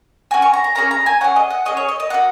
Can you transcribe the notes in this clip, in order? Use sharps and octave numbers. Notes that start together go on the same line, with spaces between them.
C#4 F#4 G#5
C#6
A#5
A#5
A#3 C#4 G#4 A#5
A#5
G#5
C#4 G#4 F#5
D#5
F#5
C#4 G#4 D#5
C#5
D#5
D#5
A#3 F#4 F#5